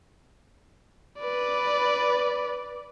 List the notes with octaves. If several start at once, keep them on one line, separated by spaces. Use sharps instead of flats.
B4 D5